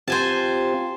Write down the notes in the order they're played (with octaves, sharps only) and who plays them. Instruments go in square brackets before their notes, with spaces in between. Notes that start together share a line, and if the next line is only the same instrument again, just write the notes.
[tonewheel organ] C4 F4 G4 [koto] C5 G#5 A5